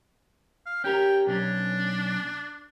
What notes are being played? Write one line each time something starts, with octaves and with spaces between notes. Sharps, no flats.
F5
C#4 G4 A#4 G5
B1 C#4 D4